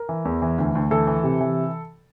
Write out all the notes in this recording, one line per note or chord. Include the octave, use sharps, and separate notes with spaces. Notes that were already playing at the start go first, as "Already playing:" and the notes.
Already playing: A#4
E3
E2
E3
D2
D2
E3 A4
E3
C3
E3